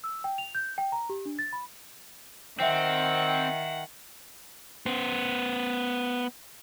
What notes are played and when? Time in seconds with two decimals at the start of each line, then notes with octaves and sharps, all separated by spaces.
0.04 E6
0.24 G5
0.38 F7
0.55 G6
0.78 G5
0.92 A#5
1.10 G4
1.26 D4
1.39 A6
1.53 B5
2.60 D#3 C4 E5 F#5 G5
4.86 B3 C5